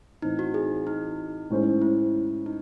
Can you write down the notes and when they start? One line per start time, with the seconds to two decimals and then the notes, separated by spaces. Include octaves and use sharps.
0.22 A2 E3 C4 D#4
0.39 F#4
0.54 G#4
0.87 D#4
1.50 A2 G#3 C#4 G#4 C5
1.82 E4
2.46 D#4